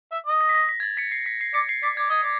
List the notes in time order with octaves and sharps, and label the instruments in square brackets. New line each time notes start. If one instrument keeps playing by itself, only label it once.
[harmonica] E5
D#5
[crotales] A#6
B6
A#6
B6
G#6
A6
B6 C#7
C7
B6
C7
[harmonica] D5 [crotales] B6 C#7
[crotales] C7
[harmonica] D5 [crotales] B6
[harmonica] D5 [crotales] G#6
[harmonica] D#5 [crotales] G#6
[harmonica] D5